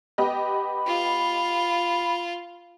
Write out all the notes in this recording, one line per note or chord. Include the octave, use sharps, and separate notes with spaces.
B3 G4 D#5 B5
F4